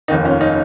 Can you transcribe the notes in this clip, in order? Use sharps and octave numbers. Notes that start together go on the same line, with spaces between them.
F1 D#2 D#3 D#4
C#4 F4
D#4